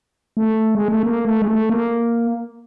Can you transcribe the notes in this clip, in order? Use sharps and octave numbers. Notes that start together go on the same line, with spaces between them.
A3
G#3
A3
A#3
A3
G#3
A3
A#3